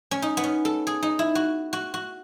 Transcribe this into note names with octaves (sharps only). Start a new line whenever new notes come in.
C#4
D#4
B3
C#4
A4
G#4
D#4
E4
F#4
F#4
F#4